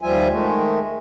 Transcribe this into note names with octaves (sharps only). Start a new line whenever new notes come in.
D#2 F3 G3 F4 E5 G#5
D#3 G#3 A3